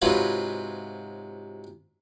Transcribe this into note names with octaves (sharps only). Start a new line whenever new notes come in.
G#2 C3 F#3 F4 B4